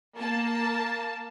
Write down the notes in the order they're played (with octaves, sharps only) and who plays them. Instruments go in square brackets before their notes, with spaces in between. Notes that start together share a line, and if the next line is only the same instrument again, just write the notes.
[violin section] A#3 A5